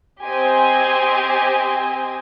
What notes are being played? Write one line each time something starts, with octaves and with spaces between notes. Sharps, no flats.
C4 G4 C5 D#5 G#5